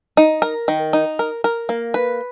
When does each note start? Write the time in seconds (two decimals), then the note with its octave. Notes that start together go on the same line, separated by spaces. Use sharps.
0.17 D#4
0.42 A#4
0.68 D#3
0.93 D#4
1.19 A#4
1.44 A#4
1.69 A#3
1.94 B4